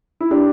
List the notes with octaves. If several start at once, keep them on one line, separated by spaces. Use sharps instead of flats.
E4
D4 G4